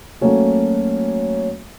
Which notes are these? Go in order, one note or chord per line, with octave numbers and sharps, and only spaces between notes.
F#3 A3 A#3 C#4 F#4